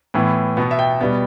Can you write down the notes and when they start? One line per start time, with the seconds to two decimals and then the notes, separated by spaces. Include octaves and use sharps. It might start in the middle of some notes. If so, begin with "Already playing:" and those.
0.14 A2 E3 B3
0.57 B2 B3
0.71 E5
0.79 G5
1.01 B2 G3 B3